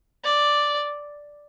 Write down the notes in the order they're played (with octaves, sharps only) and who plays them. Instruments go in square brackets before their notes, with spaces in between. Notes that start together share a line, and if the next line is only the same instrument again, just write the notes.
[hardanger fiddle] D5